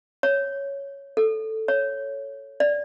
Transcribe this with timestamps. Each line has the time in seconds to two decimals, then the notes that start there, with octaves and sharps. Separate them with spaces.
0.23 C#5
1.17 A4
1.68 C#5
2.60 D5